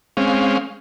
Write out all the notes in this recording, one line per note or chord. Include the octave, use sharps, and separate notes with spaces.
G#3 C4 C#4 F5